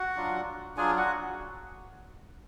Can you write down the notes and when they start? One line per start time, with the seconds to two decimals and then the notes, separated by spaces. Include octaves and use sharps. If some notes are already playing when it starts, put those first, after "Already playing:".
Already playing: F#4 F#5
0.16 F#3 D4 F4
0.77 F#3 D4 F4 G#4 G#5
0.97 F#4 F#5